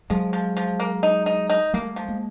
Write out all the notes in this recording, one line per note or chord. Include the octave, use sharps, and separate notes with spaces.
F3 F#3 G#3
F3
F3
A#3
D#4
D#4
D#4
G3 A3 A#3
F3
G#3 A#3